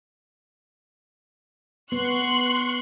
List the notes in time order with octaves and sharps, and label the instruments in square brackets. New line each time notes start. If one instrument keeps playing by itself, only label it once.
[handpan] B3 [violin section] C6 C#6 F#6